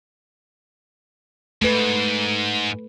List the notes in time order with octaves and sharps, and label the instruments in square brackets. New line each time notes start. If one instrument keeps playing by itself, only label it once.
[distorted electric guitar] G#2 [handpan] A3 B4